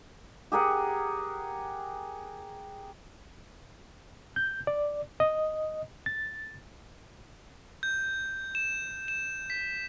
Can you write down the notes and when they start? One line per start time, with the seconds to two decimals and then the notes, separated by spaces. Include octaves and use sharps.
0.52 G4 G#4 A#4 F#5
4.36 G6
4.67 D5
5.20 D#5
6.06 A6
7.83 G6
8.55 E7
9.08 E7
9.50 B6